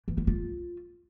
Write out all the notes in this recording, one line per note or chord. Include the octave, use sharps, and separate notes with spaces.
E3
E4
F4